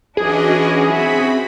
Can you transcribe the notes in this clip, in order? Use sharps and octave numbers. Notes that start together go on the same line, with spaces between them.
E3 C#4 D4 F#4 G#4 D#5
C4 F#4 E5 B5